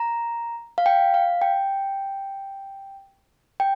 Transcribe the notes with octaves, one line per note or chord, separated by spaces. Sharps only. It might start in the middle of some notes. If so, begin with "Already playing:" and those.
Already playing: A#5
F5
G5
F5
G5
G5